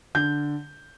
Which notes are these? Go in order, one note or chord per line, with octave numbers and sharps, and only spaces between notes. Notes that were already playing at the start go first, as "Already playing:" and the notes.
D3 G6